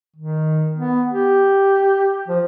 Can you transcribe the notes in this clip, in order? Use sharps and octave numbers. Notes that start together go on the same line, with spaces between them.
D#3
B3
G4
F3